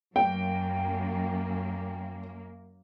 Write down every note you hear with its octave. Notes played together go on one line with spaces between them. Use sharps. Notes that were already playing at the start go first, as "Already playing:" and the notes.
F#2 A#3 G5